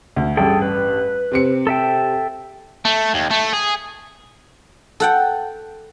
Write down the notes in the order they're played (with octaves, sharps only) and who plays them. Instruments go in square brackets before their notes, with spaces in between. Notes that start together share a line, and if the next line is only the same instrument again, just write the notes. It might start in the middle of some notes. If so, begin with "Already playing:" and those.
[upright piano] D2
[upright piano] A1 G2 [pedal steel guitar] G#4 A4 G5
[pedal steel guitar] B4
[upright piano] C3 C4 C#7
[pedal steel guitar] A4 E5 G5
[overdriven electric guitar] A3
D#2
A3
G#4
[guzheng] A4 F#5 G5